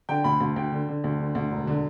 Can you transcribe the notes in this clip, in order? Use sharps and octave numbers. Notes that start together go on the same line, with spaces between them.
D3 G5
D2 B5
D2
D2 G5
D3
D3
D2
D3
D2
E1
D3